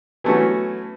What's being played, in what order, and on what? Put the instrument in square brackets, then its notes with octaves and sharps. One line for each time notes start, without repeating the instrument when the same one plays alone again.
[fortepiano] E3 F#3 A3 B3 C#4 F#4